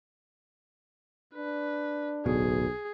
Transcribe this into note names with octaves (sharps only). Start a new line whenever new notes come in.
D4 B4
D1 B1 B2 G#4